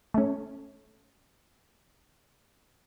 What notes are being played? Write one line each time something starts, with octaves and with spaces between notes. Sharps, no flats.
A3 C#4